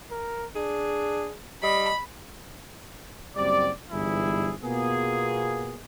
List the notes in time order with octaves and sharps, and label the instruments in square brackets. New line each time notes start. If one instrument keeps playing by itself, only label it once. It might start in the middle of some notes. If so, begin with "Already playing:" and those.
[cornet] A#4
[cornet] D4 [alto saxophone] G#4
[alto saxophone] G3 [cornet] D#5 [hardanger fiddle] B5
[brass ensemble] F#1 F#2 G3 C4 D5
G1 G#2 E3 G3 E4 G#4
B2 A#3 B3 F4 G#4